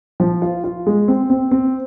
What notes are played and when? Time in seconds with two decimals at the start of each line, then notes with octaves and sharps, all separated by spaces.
0.20 F3
0.42 F4
0.64 F4
0.87 G#3
1.08 C4
1.30 C4
1.51 C4